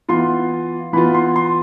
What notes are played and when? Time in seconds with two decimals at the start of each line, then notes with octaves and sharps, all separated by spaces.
0.08 E3 B3 F4 C6
0.93 E3 B3 F4 B5
1.14 C6
1.36 C6